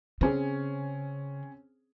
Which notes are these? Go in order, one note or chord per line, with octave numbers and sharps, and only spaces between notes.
C#3 C4 C#4 G#4